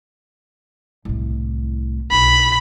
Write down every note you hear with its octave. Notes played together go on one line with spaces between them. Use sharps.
C2 A2
B1 B5